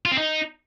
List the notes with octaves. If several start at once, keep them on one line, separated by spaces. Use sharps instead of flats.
F4
C4
D#4